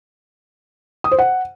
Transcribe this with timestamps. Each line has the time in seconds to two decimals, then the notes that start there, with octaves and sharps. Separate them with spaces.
1.04 D#6
1.11 C5
1.19 F#5